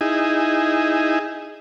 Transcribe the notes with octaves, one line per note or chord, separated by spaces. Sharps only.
D#4 E4 G#4